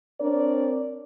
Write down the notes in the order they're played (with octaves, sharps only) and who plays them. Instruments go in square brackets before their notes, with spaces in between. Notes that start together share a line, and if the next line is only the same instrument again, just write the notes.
[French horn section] C4 D4 A#4 C#5 D5